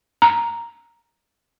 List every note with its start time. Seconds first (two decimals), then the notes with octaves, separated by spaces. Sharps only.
0.22 A#5